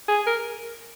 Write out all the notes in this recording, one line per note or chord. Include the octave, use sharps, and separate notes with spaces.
G#4
A#4